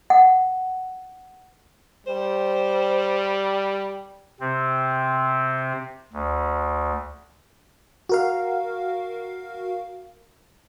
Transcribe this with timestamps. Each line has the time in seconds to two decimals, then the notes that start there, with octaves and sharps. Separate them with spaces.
0.10 F#5
2.07 G3 C5
4.40 C3 C4
6.13 D2
8.09 F#4 A#4 F5